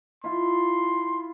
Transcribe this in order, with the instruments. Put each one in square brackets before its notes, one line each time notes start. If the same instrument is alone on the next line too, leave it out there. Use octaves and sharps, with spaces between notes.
[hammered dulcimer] E4 F4 [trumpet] C6